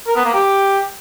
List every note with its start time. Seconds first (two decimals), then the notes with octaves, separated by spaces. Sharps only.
0.07 A#4
0.16 B3
0.25 A#3
0.34 G4